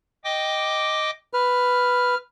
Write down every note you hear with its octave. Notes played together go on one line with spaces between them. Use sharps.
D#5 G5 D6
B4 F6